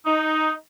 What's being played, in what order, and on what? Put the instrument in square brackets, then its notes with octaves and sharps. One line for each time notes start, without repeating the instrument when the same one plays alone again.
[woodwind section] D#4